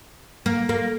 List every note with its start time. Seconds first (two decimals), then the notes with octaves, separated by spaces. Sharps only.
0.46 A#3
0.69 A#3